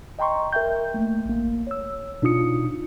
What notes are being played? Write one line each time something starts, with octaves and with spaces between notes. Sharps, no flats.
D#5 G5 A#5 C6 C#6
A#4 E5 G5 G6
A3 A#3
A1 A#3
C#5 E6
B2 D4 D#4 F4 D#6 C#7